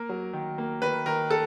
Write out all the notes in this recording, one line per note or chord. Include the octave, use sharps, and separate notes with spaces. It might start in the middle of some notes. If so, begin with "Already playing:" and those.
Already playing: A#3 A#4
F#3
D#3
A#3
D#3 B4
D#3 A#4
A4